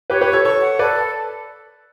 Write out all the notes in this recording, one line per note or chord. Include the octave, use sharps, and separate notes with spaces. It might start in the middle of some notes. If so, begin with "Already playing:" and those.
G4 B4 C#5
G4 B4
C#6
A4 C#5
A4 C#5 C#6
F#5
A4 B4 D5